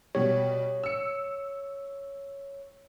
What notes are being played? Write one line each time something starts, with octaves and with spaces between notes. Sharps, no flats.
B2 G3 C#5
E6 C#7